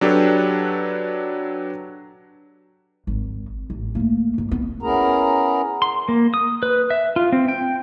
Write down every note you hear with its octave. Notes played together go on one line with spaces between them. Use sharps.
F#3 D4 G4 A4 B4 C#5
G#1
A1
A3 A#3
G#2
B3
B3 C#4 E4 G#4 A#4 A#5
C6
A#3
D#6
B4
E5
F4
C4
G5